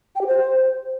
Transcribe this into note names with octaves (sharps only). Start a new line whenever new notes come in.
G5
G4
C5